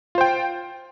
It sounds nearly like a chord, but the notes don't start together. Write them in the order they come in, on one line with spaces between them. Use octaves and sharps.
F4 C5 G5